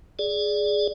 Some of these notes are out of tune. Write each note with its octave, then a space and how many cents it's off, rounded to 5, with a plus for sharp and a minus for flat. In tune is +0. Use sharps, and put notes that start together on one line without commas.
G#4 +0 D5 -5